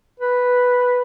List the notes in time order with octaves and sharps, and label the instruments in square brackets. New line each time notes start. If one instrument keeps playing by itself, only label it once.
[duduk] B4